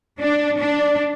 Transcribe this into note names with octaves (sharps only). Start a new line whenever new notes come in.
D4
D4